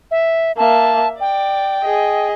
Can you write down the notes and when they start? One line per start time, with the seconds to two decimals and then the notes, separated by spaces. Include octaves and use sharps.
0.11 E5
0.57 A#3 E5 A5
1.21 D5 G5
1.84 G#4 D#5